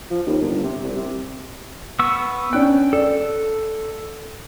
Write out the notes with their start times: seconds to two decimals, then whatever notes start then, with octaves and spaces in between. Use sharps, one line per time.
0.11 F3
0.27 D#2
0.42 G1
0.64 C3
0.84 C2
0.96 C3
1.99 B3 C#6 E6
2.53 C#4 D4 G5 F#6
2.93 A4 D5